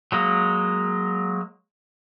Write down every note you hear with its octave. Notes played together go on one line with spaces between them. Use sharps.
F#3 G#3 A#3